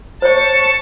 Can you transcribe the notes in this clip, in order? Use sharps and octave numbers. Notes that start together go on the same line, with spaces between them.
C5 C#5 A5 C#6